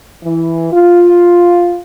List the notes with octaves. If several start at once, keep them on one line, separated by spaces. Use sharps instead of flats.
E3
F4